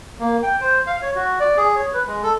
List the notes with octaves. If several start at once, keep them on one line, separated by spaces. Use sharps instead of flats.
A#3
G5
C5
F5
C#5
F#4
D5
G#4
C#5
B4
G#3
A4